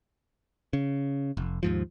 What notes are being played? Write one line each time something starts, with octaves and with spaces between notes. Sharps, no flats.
C#3
F1
D#2 G#2 F3